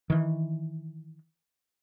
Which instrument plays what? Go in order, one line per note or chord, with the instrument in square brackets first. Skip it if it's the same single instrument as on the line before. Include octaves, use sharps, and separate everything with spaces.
[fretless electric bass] D#3 E3